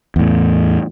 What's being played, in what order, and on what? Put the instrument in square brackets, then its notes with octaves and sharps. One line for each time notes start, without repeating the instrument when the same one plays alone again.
[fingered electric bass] E2 A2